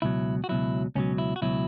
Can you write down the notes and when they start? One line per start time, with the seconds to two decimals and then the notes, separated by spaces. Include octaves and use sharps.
0.02 C#2 B2 F#3 E4
0.44 F#4
0.49 C#2 B2 F#3 E4
0.95 C#2 B2 F#3 C#4
1.18 E4
1.36 F#4
1.42 C#2 B2 F#3 E4